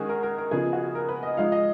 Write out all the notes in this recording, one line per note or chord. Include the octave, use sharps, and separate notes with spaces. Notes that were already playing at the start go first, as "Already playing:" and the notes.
Already playing: D#3 G#3 C#4 F#4 G#4
A#4
A#4
A#4
C#3 F3 B3 D#4 G#4
F#4
A#4
B4
D#5
F3 G#3 D#4 F5
D#5